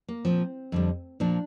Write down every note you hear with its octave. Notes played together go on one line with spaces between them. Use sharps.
A#3
A#2 F3 C4
F2 D3 G3
A#2 F3 D4